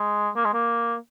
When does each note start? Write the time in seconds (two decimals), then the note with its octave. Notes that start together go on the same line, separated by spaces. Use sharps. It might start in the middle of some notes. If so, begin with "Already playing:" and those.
Already playing: G#3
0.36 A#3
0.45 G#3
0.54 A#3